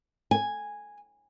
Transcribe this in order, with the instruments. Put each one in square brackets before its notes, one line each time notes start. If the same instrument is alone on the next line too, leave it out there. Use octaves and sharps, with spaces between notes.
[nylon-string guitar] G#5